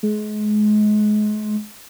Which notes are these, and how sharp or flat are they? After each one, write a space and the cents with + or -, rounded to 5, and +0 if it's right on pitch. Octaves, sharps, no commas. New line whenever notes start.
G#3 +30